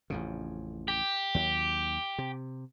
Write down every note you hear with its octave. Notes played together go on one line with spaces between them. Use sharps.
A1 F2 C#3
G4
D#2 F#3
C3